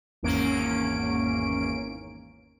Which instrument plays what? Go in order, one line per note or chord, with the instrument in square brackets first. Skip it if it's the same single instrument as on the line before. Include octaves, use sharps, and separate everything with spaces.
[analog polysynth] G#1 E2 A#3 C#4 D7